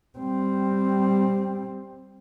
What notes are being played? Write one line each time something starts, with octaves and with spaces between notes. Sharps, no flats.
G3 C4